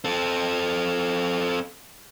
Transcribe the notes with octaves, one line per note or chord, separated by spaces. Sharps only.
C4 A4